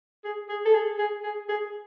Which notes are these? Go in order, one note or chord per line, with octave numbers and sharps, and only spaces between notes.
G#4
G#4
A4
G#4
G#4
G#4
G#4